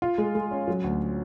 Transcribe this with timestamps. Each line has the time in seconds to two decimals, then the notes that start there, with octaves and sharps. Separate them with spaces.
0.02 F4
0.18 G#3
0.35 G#3
0.51 C#4
0.68 F#3
0.84 D2